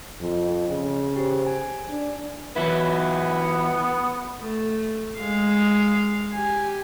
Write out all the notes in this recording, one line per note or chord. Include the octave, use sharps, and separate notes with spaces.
F2
C#3
G4 C5
G#5
D4
E3 F#3 B3 E4
A3
G#3 F5
G4 G#5